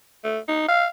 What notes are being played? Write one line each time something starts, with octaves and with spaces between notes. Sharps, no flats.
A3
D#4
F5